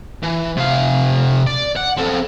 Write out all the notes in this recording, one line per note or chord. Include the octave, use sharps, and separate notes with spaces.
E3
C3 F5
D5
F#5
C4 A4